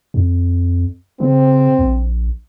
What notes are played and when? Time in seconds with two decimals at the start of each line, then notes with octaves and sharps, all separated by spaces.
0.14 F2
1.20 C#3 C4
1.79 A#1